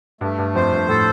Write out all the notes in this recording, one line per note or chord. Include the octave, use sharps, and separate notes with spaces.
G2 A3
G2
F2 C5
G2
A2 A4